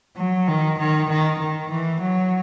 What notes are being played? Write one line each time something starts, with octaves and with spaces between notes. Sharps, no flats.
F#3
D#3
D#3
D#3
D#3
E3
F#3